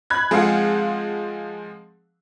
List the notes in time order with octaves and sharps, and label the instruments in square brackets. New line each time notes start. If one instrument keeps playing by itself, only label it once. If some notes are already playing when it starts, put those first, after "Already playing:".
[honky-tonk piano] B5 F#6 G#6
[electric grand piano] F3 G#3 C4 [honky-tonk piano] G#4 F5 F#5